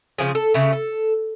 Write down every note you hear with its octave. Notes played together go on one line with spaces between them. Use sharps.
C#3 F3 G#4
A4
C#3 A3
A4